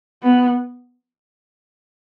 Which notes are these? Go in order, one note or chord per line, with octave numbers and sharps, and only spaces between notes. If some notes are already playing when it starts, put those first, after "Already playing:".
B3